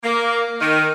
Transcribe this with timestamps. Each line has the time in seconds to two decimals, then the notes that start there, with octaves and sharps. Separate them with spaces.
0.04 A#3
0.61 D#3